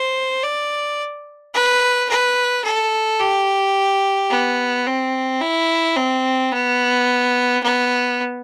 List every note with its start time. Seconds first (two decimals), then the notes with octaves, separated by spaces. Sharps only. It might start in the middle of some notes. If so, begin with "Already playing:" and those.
Already playing: C5
0.43 D5
1.54 B4
2.09 B4
2.64 A4
3.19 G4
4.30 B3
4.86 C4
5.41 E4
5.96 C4
6.52 B3
7.63 B3